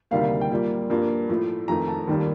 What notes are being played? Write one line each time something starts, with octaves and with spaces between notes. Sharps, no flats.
D2 C3 D#3 G3 A#3 F5
F5
G5
A#2 G3 A#3
G2 F3 A#3
A2 F3 A3
F2 D#3 A3 A#5
A5
D#2 D#3 G3 A#3